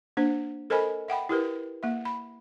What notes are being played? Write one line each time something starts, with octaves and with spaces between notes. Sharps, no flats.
A#3 D4 C5
A4 A#4 C5 D#5 G#5 B5
E5 F#5 G5 B5
E4 G4 A#4 B4
A#3 E5
B5